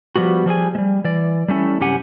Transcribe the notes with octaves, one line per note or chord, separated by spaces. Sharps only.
F3 G3 B3 F#4
F3 G3 G#4 G#5
G3 G#3
E3 D5
G3 A3 C#4 E4
F#2 C3 C#4 G4 F#5 G#5